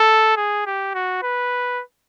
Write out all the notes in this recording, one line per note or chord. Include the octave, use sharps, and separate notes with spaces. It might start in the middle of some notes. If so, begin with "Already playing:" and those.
Already playing: A4
G#4
G4
F#4
B4